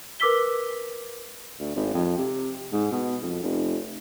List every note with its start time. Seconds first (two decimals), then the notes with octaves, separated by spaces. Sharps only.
0.20 A#4 B4 D6 E6 B6 G7
1.60 D2
1.75 G#1
1.94 F2
2.18 C3
2.72 G#2
2.91 B2
3.22 F2
3.43 F1